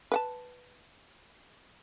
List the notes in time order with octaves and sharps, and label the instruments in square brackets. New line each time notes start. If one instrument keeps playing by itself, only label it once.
[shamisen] B4 F#5 A5